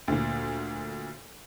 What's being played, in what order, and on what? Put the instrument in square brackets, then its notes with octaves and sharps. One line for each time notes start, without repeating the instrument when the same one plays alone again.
[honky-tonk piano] D2 A#2